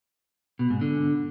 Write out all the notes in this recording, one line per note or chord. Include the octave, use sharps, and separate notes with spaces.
B2
G#2
D3